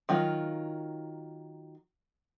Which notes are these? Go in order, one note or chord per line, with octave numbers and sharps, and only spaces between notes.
D#3 F#3 F4